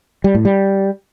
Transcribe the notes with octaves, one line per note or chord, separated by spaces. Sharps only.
G3
A2
G3